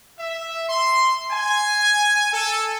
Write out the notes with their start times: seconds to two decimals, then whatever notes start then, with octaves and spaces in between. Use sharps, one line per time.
0.19 E5
0.69 C6
1.31 G#5
2.33 A4